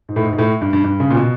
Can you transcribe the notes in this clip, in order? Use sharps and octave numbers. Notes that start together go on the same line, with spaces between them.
G#2
A2
G#2
G#2
A2
G2
G2
G2
C#3
A#2
B2